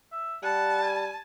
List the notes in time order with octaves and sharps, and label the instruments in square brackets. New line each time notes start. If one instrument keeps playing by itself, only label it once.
[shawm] E5
[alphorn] G3 [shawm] F#5 [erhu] A5
[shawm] G#5